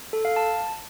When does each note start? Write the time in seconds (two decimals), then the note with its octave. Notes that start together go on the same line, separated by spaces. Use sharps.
0.13 A4
0.25 F5
0.36 A5